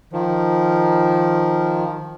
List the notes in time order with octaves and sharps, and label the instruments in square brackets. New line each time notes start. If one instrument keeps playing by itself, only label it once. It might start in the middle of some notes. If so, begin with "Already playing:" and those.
[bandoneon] D#3 F3